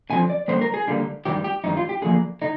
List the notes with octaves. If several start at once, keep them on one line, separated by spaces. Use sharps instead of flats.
D3 F3 C4 G#5
D5
D3 G3 A#3 C5
A#4
G#4
D3 G3 A#3
G2 D#3 G3 G4
G4
G2 D#3 G3 D#4
F4
G4
D3 F3 A#3 G#4
D3 D#4